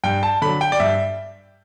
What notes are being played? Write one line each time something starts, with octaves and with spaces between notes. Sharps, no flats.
G2 G5
A5
D3 F#3 B5
G5
D5
G2 E5